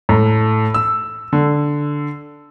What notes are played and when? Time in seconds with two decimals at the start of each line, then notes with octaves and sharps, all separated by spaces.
0.09 A2
0.74 E6
1.33 D3